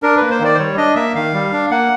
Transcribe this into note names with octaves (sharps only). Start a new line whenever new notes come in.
D4 A#4
A#3 B4
C5
D#3 D5
C5
G3 C#5
D4 D#5
A#3 E5
D#3 F5
G3
D4
A#3 F#5